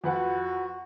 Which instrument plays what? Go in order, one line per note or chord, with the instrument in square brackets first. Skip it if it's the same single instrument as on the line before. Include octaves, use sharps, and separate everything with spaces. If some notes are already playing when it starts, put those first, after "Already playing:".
[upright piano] F2 B4 F#5 [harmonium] F#4